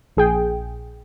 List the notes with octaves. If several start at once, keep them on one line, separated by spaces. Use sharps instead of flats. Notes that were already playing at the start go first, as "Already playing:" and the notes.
A#1 G#4 G5